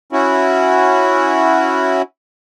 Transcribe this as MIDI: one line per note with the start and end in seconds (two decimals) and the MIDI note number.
0.12 2.02 61
0.12 2.02 64
0.12 2.02 66